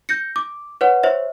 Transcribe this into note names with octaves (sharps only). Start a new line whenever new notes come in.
G6 A#6 C#7
D6
B4 C#5 F#5
C5 C#5 E5